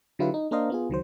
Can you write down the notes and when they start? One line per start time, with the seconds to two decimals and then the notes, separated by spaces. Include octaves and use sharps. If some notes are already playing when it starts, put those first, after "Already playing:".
0.19 D3 F#3 E4 F4 G4 B4
0.34 D#4
0.51 A#3 D4 A#4 C5 D#5 F5
0.70 B3 F4 G#4
0.89 C#2 D#3 F#3 C5